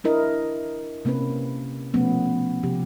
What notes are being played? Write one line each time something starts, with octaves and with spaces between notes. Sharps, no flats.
D4 E4 A#4 D#5
C3 A#3 C4 C#4 B4
B2 F3 A3 B3 C#4
C3 F3 G4